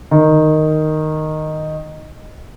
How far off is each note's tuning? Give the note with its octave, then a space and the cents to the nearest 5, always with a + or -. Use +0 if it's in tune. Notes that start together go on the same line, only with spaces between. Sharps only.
D#3 -5